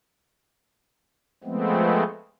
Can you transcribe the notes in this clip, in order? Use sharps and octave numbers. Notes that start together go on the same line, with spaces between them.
F3 G#3 A3 B3 C4